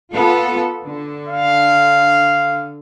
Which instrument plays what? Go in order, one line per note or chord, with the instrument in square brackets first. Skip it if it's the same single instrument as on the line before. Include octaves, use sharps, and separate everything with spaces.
[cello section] B3 F4 A4
D3
[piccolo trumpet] F5